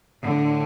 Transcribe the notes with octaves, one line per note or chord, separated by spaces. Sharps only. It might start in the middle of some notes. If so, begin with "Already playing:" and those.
A2 D3